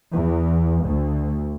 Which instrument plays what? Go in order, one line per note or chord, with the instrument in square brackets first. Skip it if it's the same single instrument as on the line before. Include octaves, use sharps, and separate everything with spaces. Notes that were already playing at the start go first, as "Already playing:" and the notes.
[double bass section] E2
D2